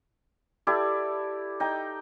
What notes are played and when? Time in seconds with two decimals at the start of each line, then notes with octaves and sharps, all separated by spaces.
0.67 E4 G4 A4 D5
1.60 D#4 G5